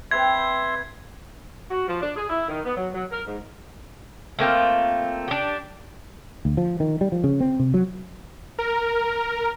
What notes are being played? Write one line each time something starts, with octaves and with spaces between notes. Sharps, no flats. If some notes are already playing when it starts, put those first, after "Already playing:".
C4 B4 E5 G5 C6 G#6
F#4
F3
D4
G#4
E4
D#3
B3
F#3
F#3
A#4
G#2
A3 A#3 C4 F4
D4 G4
D2
F3
D#3
G3
F3
C#3
C4
C3
F#3
A#4